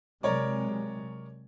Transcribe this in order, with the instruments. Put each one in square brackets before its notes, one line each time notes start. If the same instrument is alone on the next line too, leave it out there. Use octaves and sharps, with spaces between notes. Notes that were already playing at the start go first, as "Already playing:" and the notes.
[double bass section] C3 F#3 G#3 [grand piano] A#4 C#5 D5